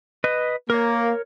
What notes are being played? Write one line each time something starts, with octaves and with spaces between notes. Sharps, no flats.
B4 D#5
A#3 A#4 C#5